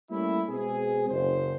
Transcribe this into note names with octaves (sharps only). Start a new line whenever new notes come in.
G3 A3 A#3 C#4 E4
B2 G#3 C4 G#4
F#1 C5